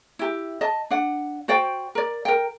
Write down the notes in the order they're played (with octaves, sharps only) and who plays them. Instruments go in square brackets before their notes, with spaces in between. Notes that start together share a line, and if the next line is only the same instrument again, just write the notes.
[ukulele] E4 G4
D#5 A5
D4 F#5
F#4 C5 D5 G5
A#4 D5
A#4 G5